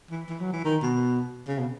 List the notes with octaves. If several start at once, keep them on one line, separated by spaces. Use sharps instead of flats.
E3
E3
F#3
E3
D#3
B2
C#3
B2